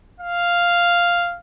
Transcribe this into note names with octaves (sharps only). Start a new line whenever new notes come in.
F5